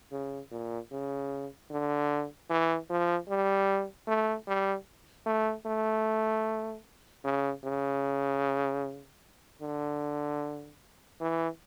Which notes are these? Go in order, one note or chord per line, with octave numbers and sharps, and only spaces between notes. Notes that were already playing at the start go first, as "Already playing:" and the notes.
C#3
A#2
C#3
D3
E3
F3
G3
A3
G3
A3
A3
C#3
C#3
D3
E3